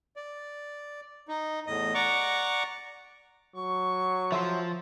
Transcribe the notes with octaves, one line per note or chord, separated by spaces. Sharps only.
D5
D#4
E2 A2 D#5
D5 F#5 A#5 C#6 D6
F#3 C#6
F3 E5 C6